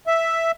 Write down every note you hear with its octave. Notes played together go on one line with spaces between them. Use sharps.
E5